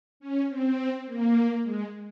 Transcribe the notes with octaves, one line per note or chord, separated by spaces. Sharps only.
C#4
C4
A#3
G#3